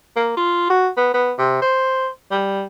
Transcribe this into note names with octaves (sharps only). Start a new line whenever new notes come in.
A#3
F4
F#4
B3
B3
C3
C5
G3